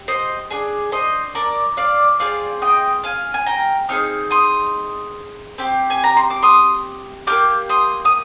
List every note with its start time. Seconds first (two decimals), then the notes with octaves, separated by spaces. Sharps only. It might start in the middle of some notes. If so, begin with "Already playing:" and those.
Already playing: G4
0.08 C5 D#5
0.50 D4 G#4
0.92 C5 D#5
1.35 A#4 D5
1.77 D5 F5
2.19 C4 F4 G#4 D5 F5
2.62 D#5 G5
3.04 F5 G#5
3.34 G#5
3.46 G5 A#5
3.89 C4 D#4 G#4 F6
4.31 C6 D#6
5.58 C4 G4
5.90 G#5
6.04 A#5
6.17 C6
6.30 D6
6.43 C6 D#6
7.27 A#3 D#4 G4 D6 F6
7.69 C6 D#6
8.05 D#6